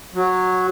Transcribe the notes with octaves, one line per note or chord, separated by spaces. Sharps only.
F#3